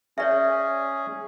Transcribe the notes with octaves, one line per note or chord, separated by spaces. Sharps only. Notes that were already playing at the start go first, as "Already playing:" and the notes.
C#4 G#4 C#5 D5 E5